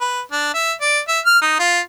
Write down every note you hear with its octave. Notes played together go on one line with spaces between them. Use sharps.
B4
D4
E5
D5
E5
F6
D#4
F4